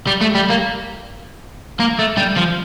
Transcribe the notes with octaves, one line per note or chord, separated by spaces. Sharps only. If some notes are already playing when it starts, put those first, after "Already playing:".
G3
A3
G3
A#3
A#3
A3
G3
F3